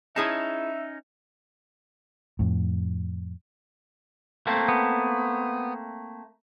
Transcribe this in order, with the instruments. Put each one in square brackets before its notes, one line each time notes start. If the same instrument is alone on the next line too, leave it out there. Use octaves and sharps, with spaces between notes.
[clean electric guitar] C#4 D#4 [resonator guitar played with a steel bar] E4 G#4 A5 [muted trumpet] E5
[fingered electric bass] F2 A2
[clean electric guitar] A3 A#3 C4
[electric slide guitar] B3